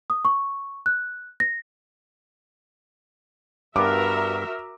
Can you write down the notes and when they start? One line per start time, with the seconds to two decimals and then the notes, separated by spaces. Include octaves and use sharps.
0.10 D#6
0.25 C#6
0.86 F#6
1.40 A#6
3.76 G2 B3 F#4 A#4 E5 D6